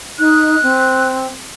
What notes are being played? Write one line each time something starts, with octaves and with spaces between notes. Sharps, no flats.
D#4 F#6
C4